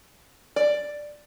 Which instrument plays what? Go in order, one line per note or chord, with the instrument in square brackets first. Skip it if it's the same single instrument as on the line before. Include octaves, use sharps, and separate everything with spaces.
[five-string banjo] D5